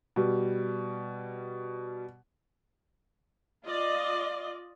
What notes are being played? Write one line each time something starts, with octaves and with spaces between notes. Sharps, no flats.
B2 G3
F4 D5 D#5